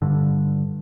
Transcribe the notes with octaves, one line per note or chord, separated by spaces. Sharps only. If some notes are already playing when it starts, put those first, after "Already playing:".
G2 D3